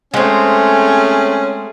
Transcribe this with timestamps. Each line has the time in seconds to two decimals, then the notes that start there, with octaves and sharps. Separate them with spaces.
0.14 G#3 A3 C4 C#4 G#4